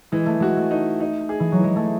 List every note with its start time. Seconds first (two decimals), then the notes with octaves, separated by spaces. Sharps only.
0.12 E3 G#3
0.26 A3
0.40 G#3 F#4
0.57 A3
0.71 D#4
1.00 D#4
1.29 G#4
1.40 E3
1.52 F#3
1.59 E3 G#3
1.76 A3